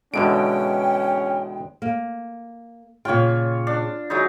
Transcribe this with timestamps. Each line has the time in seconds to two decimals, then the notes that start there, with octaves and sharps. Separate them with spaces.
0.14 E2 B2 D3 G#3 C#4 G5 D7
1.82 A#3
3.05 A#2 C#3 F4 C#5 G5
3.67 D4
4.10 F#3 G#3 D#4